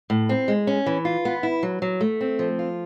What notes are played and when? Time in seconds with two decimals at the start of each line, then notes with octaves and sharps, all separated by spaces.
0.10 A2
0.29 C4
0.48 G#3
0.67 C#4
0.86 E3
1.05 F4
1.25 B3
1.43 E4
1.63 F#3
1.82 F#3
2.01 A3
2.21 C4
2.39 F3
2.59 F4